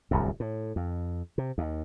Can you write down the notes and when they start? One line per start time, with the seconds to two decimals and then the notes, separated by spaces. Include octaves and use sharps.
0.11 D1 C2 F#2
0.40 A2
0.76 F2
1.38 C3
1.58 D#2